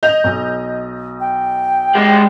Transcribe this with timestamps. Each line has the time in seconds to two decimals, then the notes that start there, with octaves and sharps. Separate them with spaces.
0.03 D#5 G6 F7
0.24 B1
1.20 G5
1.95 G#3 G4